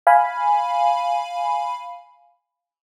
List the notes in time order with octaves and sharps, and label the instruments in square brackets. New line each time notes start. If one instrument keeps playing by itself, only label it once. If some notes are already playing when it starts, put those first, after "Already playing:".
[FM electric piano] F5 G#5 B5